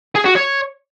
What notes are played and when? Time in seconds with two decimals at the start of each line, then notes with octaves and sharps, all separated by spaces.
0.15 G#4
0.25 F#4
0.35 C#5